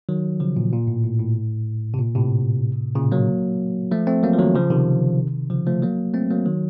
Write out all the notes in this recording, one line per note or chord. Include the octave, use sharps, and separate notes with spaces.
D#3 F#3
C#3 F3
A#2
A#2
A2
A2
A2
C3
A#2
A2 C3
A#2 C#3
F#3 A#3
F3 A3
A3 C4
F#3 A#3
F3
D#3 F#3
C#3 F3
C3 D#3
C#3 F3
F3 A3
F#3 A#3
A3 C4
F#3 A#3
D#3 F#3